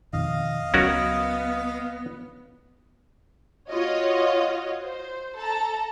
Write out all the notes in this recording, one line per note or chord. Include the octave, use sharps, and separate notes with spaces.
F2 B2 D#3 D#5 F5
C#2 F#3 B3 C#4 F#4 A#4
F4 F#4 C#5 D#5
C5
A4 A5 A#5